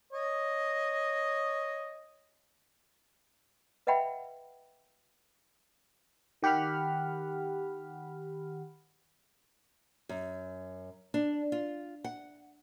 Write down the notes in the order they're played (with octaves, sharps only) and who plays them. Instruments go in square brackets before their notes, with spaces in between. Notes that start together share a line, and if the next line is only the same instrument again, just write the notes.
[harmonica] C#5 D#5
[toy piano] B4 D#5 E5 F#5 G5 B5
[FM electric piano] D#3 G4 F#5 B5 F6
[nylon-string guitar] F#2
D4
F4
F#5